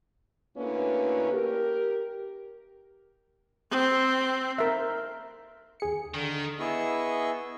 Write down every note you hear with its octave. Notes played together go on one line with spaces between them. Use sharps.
D2 D3 A#3 C#4 E4 B4
G4 A#4
C4
A#4 E5
D#2 G#4 C#7
D3 D#3
B3 E4 G#4 D#5 C#6 E6